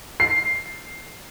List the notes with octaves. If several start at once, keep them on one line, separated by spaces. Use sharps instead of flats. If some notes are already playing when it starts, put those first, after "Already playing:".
C7